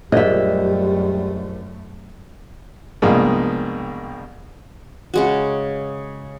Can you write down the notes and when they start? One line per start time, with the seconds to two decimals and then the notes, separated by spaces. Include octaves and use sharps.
0.12 A#1 F#2 G3 A3 D#5 E5
3.02 C2 G2 B2 F3 G#3 A#3
5.14 C#3 G#3 F#4